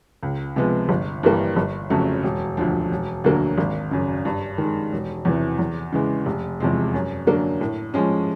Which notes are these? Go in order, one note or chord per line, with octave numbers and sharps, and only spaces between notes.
C#2
C3 F3 G#3 B3
G1
G2 E3 G3 A#3
G1
F2 C#3 F#3 A3
E1
D2 D3 F3
E1
D2 D3 F#3 A#3
G#1
F#2 C#3
G2
D#3 G#3
E1
E2 C3 E3
E2
C#3 E3 G#3
F1
E2 C3 F3 G#3
F#2
D3 F#3 A#3 D4
A2
F3 G#3 C#4